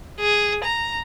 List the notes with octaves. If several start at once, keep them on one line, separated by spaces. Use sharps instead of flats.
G#4
A#5